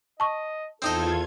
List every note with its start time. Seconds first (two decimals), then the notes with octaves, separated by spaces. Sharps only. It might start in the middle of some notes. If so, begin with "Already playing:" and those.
0.20 D#5 A5 C#6
0.82 E2 C4 D#4 F4 A4 D#5 G#6